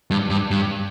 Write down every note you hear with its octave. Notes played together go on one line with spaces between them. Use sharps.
G2
G2
G2